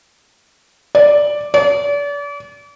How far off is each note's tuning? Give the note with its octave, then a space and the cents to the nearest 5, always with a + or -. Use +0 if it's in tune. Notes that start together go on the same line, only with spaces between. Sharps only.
D5 +0
D5 -35